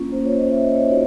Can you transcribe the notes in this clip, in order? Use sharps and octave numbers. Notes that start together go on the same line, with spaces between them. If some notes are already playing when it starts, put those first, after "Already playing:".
Already playing: A#3 C#4 F4
C5
C#5
D#5
E5
D#5
C#5
A#3 D#4 F#4 C#5